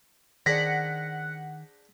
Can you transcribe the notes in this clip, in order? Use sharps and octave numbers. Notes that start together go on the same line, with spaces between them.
D#3 D4 G#4 C5 F#5 A#6 B6